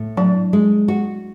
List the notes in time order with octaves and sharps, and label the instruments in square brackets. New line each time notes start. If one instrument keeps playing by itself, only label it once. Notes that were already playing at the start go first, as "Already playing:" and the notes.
Already playing: [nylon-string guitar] A2
[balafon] F#3 [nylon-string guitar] D4
[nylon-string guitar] G#3
F#4